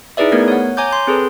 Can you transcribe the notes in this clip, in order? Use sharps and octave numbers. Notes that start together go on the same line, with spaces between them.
D#4 E4 G#4 B4 D5 E5
A3 B3 A#4 G#6
C#5 F#5
C#5 G#5 A#5 D6 G6
C6 G6
C4 G#4 A4 B4